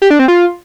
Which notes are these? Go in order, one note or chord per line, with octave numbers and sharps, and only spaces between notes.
G4
D4
C4
F4